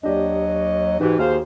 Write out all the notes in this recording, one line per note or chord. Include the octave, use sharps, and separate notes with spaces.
D#2 F#3 D4 G4 D5 D#5
G#2 E3 D#4 F#4 G4
D#2 F#4 G#4 C5 F5